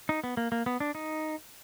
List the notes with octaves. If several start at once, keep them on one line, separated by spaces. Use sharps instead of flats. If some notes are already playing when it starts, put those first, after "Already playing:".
D#4
B3
A#3
A#3
B3
D4
D#4